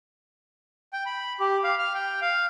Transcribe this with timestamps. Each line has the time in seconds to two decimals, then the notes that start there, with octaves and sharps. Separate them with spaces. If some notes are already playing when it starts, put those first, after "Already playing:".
0.93 G5
1.06 B5
1.40 G4
1.64 F5
1.79 F6
1.94 G5
2.21 F5